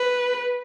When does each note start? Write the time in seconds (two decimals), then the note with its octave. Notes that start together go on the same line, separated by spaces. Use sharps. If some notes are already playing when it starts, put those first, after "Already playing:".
Already playing: B4